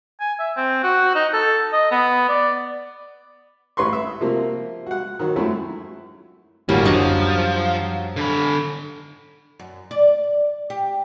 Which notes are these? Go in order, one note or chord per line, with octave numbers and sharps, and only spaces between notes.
G#5
E5
C4
F#4
D#4
A4
D#5
B3
D5
A1 B4 C6 C#6
E5
C3 F3 A#3
F#4 F#5
D#3 F#3
F#2 F3 A3 E4
G1 D2 A2 G3 A#3 C#4
F#2 F3 D4 D#5 C#6
D3 B5
F#2
D5
G4